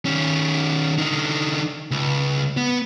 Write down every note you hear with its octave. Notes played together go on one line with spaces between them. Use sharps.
D#3 C#4
D3 D#4
C#2
B3